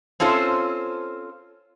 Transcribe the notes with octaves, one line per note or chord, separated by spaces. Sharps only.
C4 C#4 F4 A4 C5